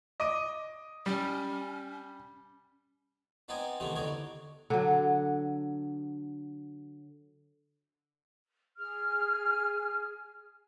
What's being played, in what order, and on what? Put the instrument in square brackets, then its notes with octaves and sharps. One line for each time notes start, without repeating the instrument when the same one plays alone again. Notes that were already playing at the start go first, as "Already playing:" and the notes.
[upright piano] D#5 D6 D#7
[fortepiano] G3 [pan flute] C#4
[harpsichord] B3 C4 D#4 D5 F#5 G#5
C3 D#3 E3 A3 B3 C4
E2 D3 D#4 C#5 D5
[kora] D3 F#3
[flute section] G#4 F6